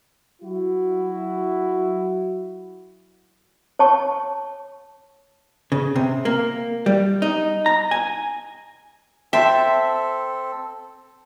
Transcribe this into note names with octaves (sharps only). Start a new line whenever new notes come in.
F#3 E4 F#4
C#5 A5 C#6
C#3
C3
A#3
G3
D#4
A#5
G#5
C4 A4 E5 G5 A5 C6